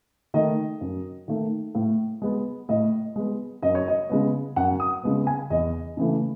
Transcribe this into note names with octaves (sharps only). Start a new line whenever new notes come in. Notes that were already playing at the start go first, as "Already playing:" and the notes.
D#3 A3 D#5
F#2
D#3 A3
A2
G#3 B3
A2 D#5
G#3 B3
F#2 D#5
C#5
D#5
C#3 G#3 B3
F#2 F#5
D#6
C#3 G#3 B3
G#5
E2 D#5
C#3 E3 A3